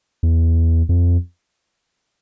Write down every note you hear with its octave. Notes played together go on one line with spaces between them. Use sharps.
E2
F2